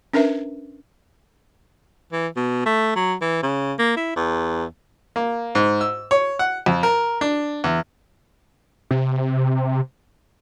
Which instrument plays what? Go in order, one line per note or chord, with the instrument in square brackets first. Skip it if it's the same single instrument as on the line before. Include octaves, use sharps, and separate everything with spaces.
[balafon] C#4 D4 A#4 B4 E5
[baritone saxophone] E3
B2
A3
F#3
E3
C#3
A#3
E4
E2
[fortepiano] A#3
G#2
E6
C#5
F#5
F2
A#4
D4
E2
[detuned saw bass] C3